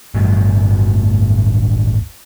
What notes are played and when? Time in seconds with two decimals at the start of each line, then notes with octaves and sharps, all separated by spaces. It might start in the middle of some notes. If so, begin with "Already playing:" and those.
0.14 D1 G1 G2 B2